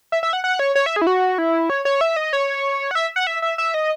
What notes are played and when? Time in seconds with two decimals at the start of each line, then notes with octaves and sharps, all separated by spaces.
0.12 E5
0.23 E5
0.33 F#5
0.44 F#5
0.59 C#5
0.75 C#5
0.86 E5
0.96 G#4
1.02 E4
1.07 F#4
1.38 E4
1.70 C#5
1.85 C#5
2.01 E5
2.16 D#5
2.33 C#5
2.91 F#5
2.95 E5
3.16 F#5
3.27 E5
3.42 E5
3.58 E5
3.74 D#5